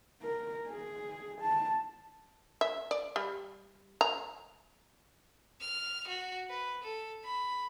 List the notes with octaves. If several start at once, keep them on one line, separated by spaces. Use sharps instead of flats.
A#4
G#4
A5
E5
D5
G3
A#5
F6
F#4
B4
A4
B5